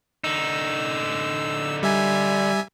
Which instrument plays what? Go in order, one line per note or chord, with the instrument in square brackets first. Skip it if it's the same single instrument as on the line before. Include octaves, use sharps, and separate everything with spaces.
[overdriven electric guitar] D3 D#4 [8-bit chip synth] E6
[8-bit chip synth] G3 E5 G#5